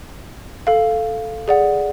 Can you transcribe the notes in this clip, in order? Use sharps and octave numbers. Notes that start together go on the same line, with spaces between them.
A4 F5
G#4 D5 F#5